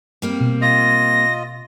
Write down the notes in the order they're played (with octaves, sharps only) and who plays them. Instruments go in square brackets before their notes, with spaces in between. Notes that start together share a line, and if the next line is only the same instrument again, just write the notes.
[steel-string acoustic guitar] G3 A#3 C4
[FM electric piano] B2
[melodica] F4 D#5 [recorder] A#6